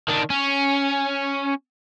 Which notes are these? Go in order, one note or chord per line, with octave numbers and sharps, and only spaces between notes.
D#3 D4
C#4